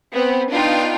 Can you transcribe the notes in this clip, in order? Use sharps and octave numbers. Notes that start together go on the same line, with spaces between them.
B3 C4
B3 D4 D#4 F4 G5